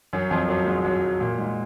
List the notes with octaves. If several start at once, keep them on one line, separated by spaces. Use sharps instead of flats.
F#2 F#3
F2 F3
F#2 F#3
G#2 G#3
F#2 F#3
A#2
G#2